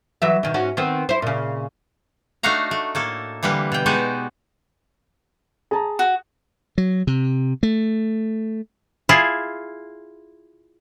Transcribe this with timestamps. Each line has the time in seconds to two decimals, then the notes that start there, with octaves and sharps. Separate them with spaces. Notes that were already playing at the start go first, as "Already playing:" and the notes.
0.22 E3 F#3 E5
0.43 B2 D#3
0.54 G#2 C#4 F#4
0.77 D#3 B3 C4
1.09 E4 C5
1.22 A#2 C#3
2.43 A3 D4 D#4 F#4 F5 A#5
2.71 A3
2.95 A2 A#3 A4
3.43 D3 E3 G3 A#3 B4
3.72 B2 G5
3.86 G#3 B3 D#4 F#4 G4 D5
5.71 G#4 A5 A#5
5.99 F#4
6.78 F#3
7.07 C3
7.63 A3
9.09 E4 F4 G#4